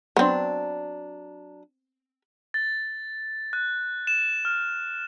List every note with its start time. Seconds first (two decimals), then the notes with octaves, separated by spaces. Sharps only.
0.17 F#3 B3 C4 D4
2.54 A6
3.53 F#6
4.07 E7
4.45 F6